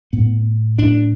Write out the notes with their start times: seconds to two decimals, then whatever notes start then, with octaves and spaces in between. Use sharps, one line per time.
0.13 A2 B3
0.78 A2 D4